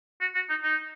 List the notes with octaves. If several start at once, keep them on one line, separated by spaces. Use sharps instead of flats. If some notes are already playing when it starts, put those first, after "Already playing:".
F#4
F#4
D#4
D#4